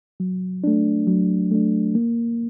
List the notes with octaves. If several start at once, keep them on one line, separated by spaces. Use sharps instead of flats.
F#3
A3 D4
F#3
A3 D4
A#3